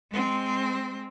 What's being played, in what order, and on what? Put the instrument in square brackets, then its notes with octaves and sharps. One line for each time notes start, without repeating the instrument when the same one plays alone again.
[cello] G#3 C4